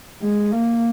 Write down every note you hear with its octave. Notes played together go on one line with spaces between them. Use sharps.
G#3
A#3